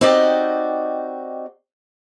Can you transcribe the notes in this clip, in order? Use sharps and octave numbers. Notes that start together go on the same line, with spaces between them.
C4 D#4 F#4 G4 D5 D#5